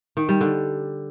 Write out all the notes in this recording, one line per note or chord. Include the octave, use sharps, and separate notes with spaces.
D#3
G3
D3